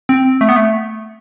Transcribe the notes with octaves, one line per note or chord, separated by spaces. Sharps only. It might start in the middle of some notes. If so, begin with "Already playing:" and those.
C4
A3
B3
A3